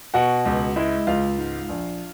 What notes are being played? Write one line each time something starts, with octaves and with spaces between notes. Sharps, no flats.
B2 F#4 F#5
C#2
G#3 E4 E5
C#2 F4 F5
G#2
A#1